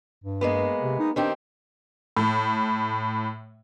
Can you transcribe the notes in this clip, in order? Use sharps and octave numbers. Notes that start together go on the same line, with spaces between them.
G2
G#3 A#3 B3
C3
D#4
D#3 C4 D4 G4
A2